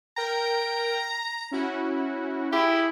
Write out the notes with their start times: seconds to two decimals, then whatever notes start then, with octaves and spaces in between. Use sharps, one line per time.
0.17 A#4 G5 A#5
1.51 C#4 E4 F#4
2.52 E4 G4 G#4